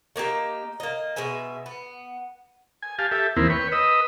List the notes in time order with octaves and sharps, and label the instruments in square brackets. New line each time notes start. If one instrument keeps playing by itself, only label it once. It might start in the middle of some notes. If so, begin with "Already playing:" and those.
[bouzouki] A3 A#3 D#4 G4
A#3 D#5
B2 G#3 E5 G#5
B3
[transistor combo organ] G#5
G4 F5 G#5 A5
G4 A4 E5
D#2 E3 A#3 C4 E4
B4 C#5 G5
B4 D#5 E6